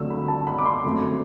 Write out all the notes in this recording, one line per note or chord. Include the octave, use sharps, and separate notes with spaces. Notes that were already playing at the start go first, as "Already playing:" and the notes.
Already playing: D2 D3 F#3 A3 C4 E6
B5
A5
B5
D6
C6
F#2 D3 A3 C4